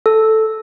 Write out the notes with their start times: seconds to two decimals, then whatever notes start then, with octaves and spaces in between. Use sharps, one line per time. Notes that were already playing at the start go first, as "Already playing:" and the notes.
0.06 A4